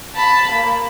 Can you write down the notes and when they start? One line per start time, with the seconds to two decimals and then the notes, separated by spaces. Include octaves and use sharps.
0.15 A5 B5
0.52 A#3